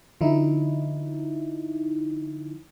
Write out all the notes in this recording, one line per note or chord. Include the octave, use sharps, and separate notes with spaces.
D3 F3 D#4 E4